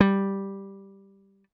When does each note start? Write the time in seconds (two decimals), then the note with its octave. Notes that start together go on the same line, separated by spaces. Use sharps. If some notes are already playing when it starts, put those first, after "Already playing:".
0.01 G3